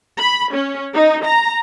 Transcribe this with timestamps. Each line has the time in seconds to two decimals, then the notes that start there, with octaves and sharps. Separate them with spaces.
0.19 B5
0.54 C#4
0.94 D#4
1.25 A#5